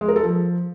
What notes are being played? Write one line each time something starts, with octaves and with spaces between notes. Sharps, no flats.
G#3
A#4
A4
F3